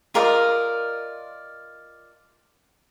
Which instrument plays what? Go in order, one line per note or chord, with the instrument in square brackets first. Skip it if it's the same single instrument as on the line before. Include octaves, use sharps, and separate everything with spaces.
[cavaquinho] F4 A#4 D5 D#5